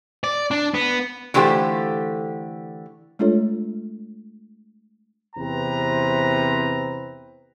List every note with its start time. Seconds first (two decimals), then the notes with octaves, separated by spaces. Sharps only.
0.24 D5
0.51 D4
0.74 B3
1.34 D3 E3 A3 F4 G4 C5
3.19 G#3 A3 D4 F4 A4 C#5
5.36 E2 C3 C4 B4 A#5